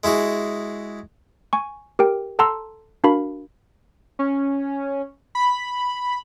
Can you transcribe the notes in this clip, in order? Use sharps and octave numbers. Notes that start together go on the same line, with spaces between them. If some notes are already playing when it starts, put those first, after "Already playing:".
G#3 E4 F#4 G#4
G#5 C#6
G4 A#4 G5
A4 F#5 A5 A#5 C6 E6
D4 F#4 A#4 F5 B5
C#4
B5